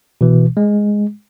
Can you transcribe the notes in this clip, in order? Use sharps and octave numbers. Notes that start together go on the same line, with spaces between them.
B2 E3
G#3